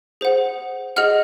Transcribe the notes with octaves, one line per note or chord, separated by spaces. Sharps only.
G#4 C5 F#5
G#4 D#5 F#5 F6